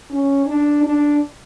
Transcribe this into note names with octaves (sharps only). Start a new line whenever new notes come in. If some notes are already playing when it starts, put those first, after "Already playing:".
C#4
D4
D4